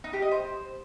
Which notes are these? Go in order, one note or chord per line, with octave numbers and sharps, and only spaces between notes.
D#4
G4
D#5
C5